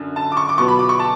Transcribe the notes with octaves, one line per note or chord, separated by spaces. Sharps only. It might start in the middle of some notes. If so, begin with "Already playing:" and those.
Already playing: F#2 D3
A5
D6
C#6
D6
B2 F#3 B3 C#6
B5
D6
C#6
A5